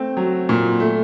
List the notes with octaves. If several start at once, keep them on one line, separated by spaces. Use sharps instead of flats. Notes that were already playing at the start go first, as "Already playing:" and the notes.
Already playing: A3 C4
F#3
A#2
A3